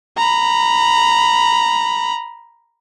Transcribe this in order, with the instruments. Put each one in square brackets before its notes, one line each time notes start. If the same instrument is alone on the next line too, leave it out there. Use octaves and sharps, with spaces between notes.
[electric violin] A#5 B5